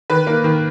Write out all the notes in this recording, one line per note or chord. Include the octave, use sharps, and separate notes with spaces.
D#3 B4
A#3
D#3